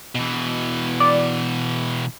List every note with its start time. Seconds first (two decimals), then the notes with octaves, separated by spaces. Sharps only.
0.15 B2 E3
1.00 D5